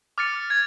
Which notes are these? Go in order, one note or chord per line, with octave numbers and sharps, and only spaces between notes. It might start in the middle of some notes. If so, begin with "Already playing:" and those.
D6 F6 A6 C#7
G#6